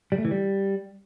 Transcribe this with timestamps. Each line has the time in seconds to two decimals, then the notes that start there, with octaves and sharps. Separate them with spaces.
0.12 G3
0.18 A3
0.25 E3
0.31 G3